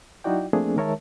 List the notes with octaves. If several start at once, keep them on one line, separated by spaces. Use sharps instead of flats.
F#3 D#4 E4 F#4 D5 G5
F3 A3 A#3 C4 D4 G#4
D#3 G#3 A#4 C#5 E5 A5